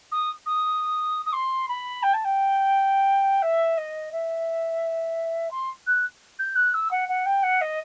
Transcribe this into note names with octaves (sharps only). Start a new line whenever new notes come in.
D#6
D#6
D#6
C6
B5
G5
A5
G5
E5
D#5
E5
C6
F#6
G6
F#6
E6
F#5
F#5
G5
F#5
D#5